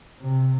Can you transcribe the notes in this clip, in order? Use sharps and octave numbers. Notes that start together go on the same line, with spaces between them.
C3